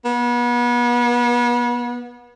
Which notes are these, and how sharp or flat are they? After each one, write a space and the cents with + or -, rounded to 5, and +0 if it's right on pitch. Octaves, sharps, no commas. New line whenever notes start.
B3 -35